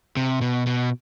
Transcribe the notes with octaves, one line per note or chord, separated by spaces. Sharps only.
C3
B2
B2